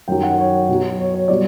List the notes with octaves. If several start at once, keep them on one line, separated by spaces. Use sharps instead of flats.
F#2 D#3 F#3 G5
F#5
C#5
B2 F#3
C#5
C#5
B2 G3 D5